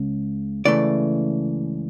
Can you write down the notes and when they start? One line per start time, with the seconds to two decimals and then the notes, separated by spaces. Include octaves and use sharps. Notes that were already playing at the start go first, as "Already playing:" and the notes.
Already playing: C#2 C#3
0.65 C#2 C#3 E3 A3 D5